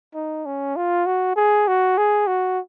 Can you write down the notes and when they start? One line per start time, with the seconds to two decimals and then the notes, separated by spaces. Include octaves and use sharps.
0.15 D#4
0.46 C#4
0.76 F4
1.06 F#4
1.36 G#4
1.68 F#4
1.98 G#4
2.27 F#4